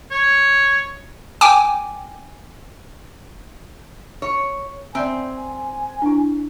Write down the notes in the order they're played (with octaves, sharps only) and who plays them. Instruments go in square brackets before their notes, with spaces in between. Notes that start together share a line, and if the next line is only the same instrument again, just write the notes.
[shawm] C#5
[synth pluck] G5 G#5 D6
[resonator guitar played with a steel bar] C#5
[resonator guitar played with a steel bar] C4 [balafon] D5 E5 [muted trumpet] G#5
[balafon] D4 E4